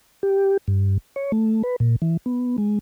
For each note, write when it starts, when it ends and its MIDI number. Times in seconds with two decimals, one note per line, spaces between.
0.23 0.57 67
0.68 0.98 43
1.16 1.32 73
1.32 1.62 57
1.63 1.76 71
1.80 1.96 46
2.02 2.17 52
2.26 2.56 59
2.58 2.79 56